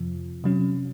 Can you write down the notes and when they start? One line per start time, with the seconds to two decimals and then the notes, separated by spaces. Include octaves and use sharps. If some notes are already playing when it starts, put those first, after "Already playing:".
Already playing: F2 C3 F3
0.44 C3 F#3 C#4